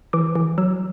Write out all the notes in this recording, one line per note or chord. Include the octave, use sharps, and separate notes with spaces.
E3 D6
E3
F#3 E6